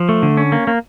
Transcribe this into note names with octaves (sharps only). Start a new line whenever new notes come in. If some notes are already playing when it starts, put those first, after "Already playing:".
Already playing: F3
A3
D3
C#4
A#3
A#3